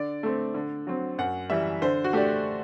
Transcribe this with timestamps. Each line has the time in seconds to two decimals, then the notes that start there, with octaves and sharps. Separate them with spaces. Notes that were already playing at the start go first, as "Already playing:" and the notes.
Already playing: D3 D5
0.23 A3 C4
0.54 D3
0.87 F#3 C4
1.18 F#2 F#5
1.50 E3 G3 E5
1.82 D3 C5
2.04 F#4
2.13 A3 D4 G4